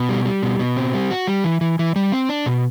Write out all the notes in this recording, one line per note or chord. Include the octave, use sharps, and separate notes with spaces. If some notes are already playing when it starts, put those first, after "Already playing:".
Already playing: B2
G3
G3
B2
B2
C4
G3
F#4
G3
E3
E3
E3
G3
C4
D4
B2